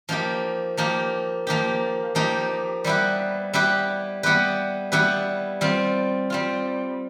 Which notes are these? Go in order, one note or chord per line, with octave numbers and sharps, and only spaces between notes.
F3 A#3 D#4 G4
F3 A#3 D#4 G4
F3 A#3 D#4 G4
F3 A#3 D#4 G4
G3 B3 E4 G4 B4
G3 B3 E4 G4 B4
G3 B3 E4 G4 B4
G3 B3 E4 G4 B4
G3 C4 F4
G3 C4 F4